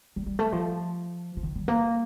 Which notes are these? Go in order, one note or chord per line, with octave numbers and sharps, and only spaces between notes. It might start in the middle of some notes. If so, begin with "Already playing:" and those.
G3
G3
A3
F3
F3
D#3
G3
A#3